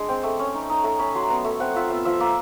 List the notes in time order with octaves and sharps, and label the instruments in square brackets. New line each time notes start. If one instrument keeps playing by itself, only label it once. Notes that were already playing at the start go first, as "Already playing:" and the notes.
Already playing: [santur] G#3 D4
C4 G5
A3 G5
C#4
D#4
D#4
A3 A#5
C#4 B5
F#3 C6
B3 A#5
A3
C4 F#5
F4 E5
B3 E5
F3 E5
A#3 E5